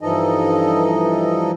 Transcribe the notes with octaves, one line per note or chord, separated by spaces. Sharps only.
G2 E3 F3 D#4 A4 D#5